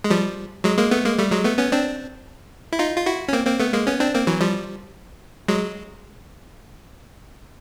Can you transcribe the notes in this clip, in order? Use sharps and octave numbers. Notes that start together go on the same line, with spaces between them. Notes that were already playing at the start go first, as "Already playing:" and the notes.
G#3
F3 G3
F#3 G#3
G#3 A#3
A3 B3
G#3 A#3
G3 A3
F#3 G#3
A3 B3
B3 C#4
C4 D4
E4
D#4 F4
F4
E4 F#4
C#4
A#3 C4
A#3 C4
A3 B3
G#3 A#3
B3 C#4
C4 D4
A#3 C4
E3 F#3
F3 G3
F#3 G#3